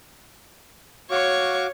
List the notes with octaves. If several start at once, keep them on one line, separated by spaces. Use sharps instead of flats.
F#4 C#5 F5 C#6 D6